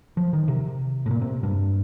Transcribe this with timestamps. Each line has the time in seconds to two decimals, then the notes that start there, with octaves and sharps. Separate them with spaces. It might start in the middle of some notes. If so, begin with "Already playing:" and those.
0.17 F3
0.33 D#3
0.48 C3
1.06 A2
1.11 A#2
1.21 C3
1.43 G2